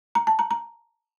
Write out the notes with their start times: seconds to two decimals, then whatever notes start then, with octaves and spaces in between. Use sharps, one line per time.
0.15 A#5
0.27 A5
0.39 A#5
0.51 A#5